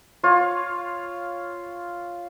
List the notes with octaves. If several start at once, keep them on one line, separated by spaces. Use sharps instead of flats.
F4 C#5